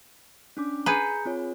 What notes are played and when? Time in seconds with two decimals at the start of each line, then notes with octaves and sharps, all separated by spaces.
0.57 C#4 D4 D6
0.86 G#4 B4 A#5 G6 C#7
1.25 C4 F4 C#5